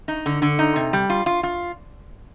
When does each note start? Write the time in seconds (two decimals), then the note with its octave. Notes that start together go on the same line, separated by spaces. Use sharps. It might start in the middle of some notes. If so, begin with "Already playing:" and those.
0.08 D#4
0.26 D3
0.42 D3
0.59 D#4
0.76 C3
0.93 G3
1.10 F4
1.26 F4
1.43 F4